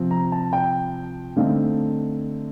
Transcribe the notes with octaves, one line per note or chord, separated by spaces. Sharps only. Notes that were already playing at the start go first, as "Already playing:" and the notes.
Already playing: C3 F3 C4
A#5
A5
G5
D3 A3 C4 D#4 F5